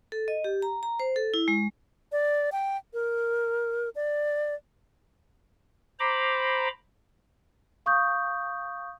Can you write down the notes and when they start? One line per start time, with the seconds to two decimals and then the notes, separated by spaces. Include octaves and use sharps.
0.12 A4
0.28 D#5
0.44 G4
0.62 A#5
0.83 A#5
1.00 C5
1.16 A4
1.34 E4
1.48 G#3
2.12 D5
2.52 G5
2.93 A#4
3.95 D5
6.00 C5 A#5 B5 D6
7.86 F5 C#6 D#6 G6